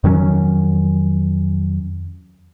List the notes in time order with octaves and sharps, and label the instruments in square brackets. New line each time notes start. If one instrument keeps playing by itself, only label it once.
[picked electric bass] F2 D#3 F#3 C#4